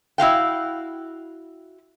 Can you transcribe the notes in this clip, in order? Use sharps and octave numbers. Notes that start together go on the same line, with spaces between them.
E4 F#4 F5 G5